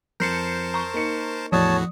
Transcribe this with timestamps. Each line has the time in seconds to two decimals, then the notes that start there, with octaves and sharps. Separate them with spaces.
0.20 F2 A#4 C5 A5 G6 C7 C#7
0.74 A#5 C#6
0.94 A#3 D#4 C#7
1.52 E2 A2 F3 F#4 C#5 A5 D#6